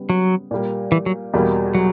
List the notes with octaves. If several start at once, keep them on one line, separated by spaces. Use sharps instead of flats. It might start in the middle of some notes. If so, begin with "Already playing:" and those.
Already playing: C#3 G3 B3
F#3
A#2 G3 A#3
E3
F#3
E2 B2 G3 A#3
F#3